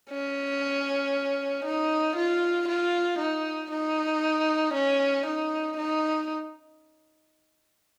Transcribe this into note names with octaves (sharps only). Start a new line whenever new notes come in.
C#4
D#4
F4
F4
D#4
D#4
C#4
D#4
D#4